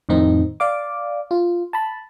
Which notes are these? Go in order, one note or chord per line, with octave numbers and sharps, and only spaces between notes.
F2 A2 D#3 C4 D#4
D5 F5 D6
F4
A5 B5